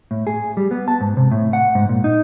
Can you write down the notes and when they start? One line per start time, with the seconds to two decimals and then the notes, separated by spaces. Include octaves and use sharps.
0.11 A2
0.27 G#4
0.57 G3
0.71 B3
0.88 A5
1.01 G#2
1.17 C3
1.32 A2
1.53 F#5
1.75 G#2
1.89 A#2
2.04 D#4